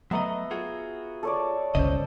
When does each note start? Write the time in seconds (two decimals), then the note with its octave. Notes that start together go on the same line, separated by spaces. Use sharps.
0.11 F#3 A3 B3 D#5 E5 A#5
0.51 F4 F#4 G#4
1.23 A4 C#5 D5
1.75 G1 C#2 C#3 C5 D#5